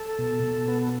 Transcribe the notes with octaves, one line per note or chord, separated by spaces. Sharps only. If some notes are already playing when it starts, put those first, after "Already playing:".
Already playing: A4
B2
B2
B3